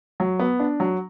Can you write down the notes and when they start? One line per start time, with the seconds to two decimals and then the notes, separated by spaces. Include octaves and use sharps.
0.20 F#3
0.39 B3
0.60 D4
0.80 F#3